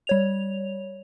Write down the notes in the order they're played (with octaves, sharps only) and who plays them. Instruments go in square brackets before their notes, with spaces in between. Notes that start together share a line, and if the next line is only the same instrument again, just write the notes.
[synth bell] G3 C#5 F7